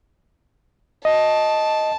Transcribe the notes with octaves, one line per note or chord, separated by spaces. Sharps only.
D#5 A5